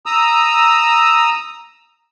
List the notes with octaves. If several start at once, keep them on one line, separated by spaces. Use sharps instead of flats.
A#5 D#6 E6